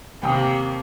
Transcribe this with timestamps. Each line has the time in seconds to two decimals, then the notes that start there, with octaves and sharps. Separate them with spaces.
0.22 D#2 C3 A#3 G5 D#6